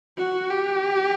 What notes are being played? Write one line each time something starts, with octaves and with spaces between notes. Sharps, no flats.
F#4
G4